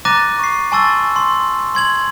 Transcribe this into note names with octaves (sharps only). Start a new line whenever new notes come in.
A#5 D6 F#6 A6 A#6 D#7
C#6 C7
G#5 A5 C6 C#6 E6 A6
C6
C6 G#6 F#7